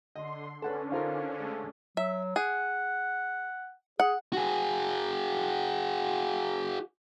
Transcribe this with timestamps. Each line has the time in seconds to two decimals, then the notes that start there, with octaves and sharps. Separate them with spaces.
0.16 D3 D#5 C6
0.62 D3 C#4 D4 A4 B4 F#5 A5
0.92 D#4 F4 A4 A#4 C5 F5
1.40 G#3 A3
1.97 F#3 E5
2.36 G#4 F#5
4.00 G#4 F#5
4.33 F#4 G#4